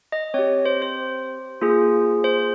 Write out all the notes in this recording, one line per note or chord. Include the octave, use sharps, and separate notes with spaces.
D#5
C4 G4 C#5
C5
C5
A#3 F4 G#4
C5